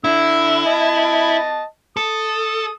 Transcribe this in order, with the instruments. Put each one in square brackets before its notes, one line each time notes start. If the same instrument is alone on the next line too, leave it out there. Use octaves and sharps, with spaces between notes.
[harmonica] D3 E6 [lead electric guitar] E4
[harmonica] D#5 A5
[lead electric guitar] A4 [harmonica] D#6